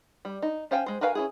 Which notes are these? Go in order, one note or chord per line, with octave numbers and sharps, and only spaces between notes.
G3
D#4
C#4 C5 F5 G5 G#5
G#3 C5
F#4 A#4 B4 F5 G#5
C#4 E4 G#4